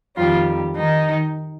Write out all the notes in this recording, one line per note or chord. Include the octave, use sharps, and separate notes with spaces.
F2 D#3 F3 G3 F4
D#3 D#4